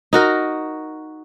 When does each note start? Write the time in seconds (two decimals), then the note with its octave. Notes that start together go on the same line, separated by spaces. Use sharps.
0.13 D#4 F#4 A#4